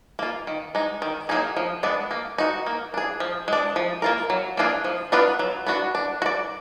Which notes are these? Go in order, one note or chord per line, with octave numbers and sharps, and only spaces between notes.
A#3 F4
D#3
G#3 D#4
D#3
F#3 A#3 D#4 G#4
F3
G#3 B3 D4
A#3
D#4 F#4
A#3
D4 G#4
F3
G#3 D4
F3
A#3 F4 A#4
F#3
A#3 D4 F4 G#4
F3
B3 D4 F4 B4
F#3
B3 D4 F#4
D4
F#4
D5